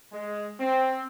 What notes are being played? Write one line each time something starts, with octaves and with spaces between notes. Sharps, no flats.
G#3
C4